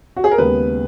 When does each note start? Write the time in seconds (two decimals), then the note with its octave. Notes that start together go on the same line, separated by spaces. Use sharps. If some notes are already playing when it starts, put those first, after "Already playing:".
0.17 F#4
0.24 G#4
0.31 A#4
0.38 D#2 C#3 G#3 B3 B4